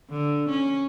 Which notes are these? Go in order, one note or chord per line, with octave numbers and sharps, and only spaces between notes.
D3
C#4